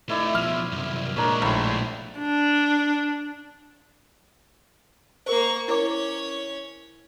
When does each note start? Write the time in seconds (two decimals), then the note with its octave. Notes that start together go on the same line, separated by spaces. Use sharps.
0.09 A3 D#4 E4 D5 E5
0.35 B2 F3 F6
0.72 C2 F#2
1.16 A#2 G#3 D4 A#4 C#5
1.42 A#1 A2 A5
2.19 D4
5.26 A#3 A#4 C5 C#6
5.68 C#4 E4 A#4 C#5 D6